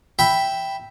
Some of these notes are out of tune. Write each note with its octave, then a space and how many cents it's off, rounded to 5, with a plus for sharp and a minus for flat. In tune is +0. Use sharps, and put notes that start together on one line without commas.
E5 +0 G5 +0 B5 +0